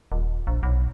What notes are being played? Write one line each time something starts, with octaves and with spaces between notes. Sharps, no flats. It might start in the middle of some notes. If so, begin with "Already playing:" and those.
D#1
A#1
B1